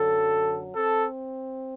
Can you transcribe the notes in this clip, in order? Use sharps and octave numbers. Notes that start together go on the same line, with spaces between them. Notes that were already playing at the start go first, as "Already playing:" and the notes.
Already playing: F#2 D3 F#3 A4
C4 A4